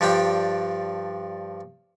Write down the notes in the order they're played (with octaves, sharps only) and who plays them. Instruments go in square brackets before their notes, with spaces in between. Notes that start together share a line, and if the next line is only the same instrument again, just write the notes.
[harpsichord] G2 F3 D4 G4 D5 G5